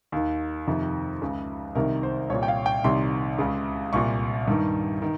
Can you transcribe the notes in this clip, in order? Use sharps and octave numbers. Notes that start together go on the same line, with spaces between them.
D#2 D#3
F2 C3 D#3
C#2 C#3
C2 C3 D#3 A#4
C5
C2 A#2 C#5
G5
F5
G5
C2 C3 D#3 C6
C#2 C#3
C2 A#2 C#6
G2 D#3
D#3